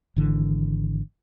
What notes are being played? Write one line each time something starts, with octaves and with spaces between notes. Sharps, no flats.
G#1 D3 E3